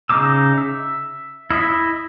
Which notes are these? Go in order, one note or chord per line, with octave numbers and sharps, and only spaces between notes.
C#3 D4 D#4 D6 E6
E5
E4 D#5 E5 B5